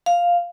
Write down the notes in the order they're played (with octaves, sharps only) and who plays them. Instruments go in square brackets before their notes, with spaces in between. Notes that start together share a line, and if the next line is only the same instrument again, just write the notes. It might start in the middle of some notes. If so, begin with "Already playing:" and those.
[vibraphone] F5